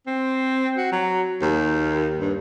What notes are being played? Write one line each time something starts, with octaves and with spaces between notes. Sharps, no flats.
C4
F#4
F#3
D#2
G2